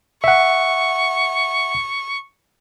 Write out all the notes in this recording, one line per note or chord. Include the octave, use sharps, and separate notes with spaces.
E5 F#5 C#6